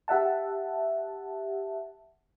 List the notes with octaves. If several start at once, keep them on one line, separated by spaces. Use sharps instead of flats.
G4 E5 F#5 A5